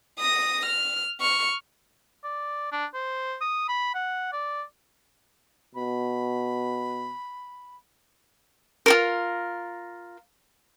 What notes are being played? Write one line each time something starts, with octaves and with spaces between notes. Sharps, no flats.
D#6 A#6
F6
C#6 F6
D5
D4
C5
D#6
B5
F#5
D5
B2 B5
F4 A4 A#4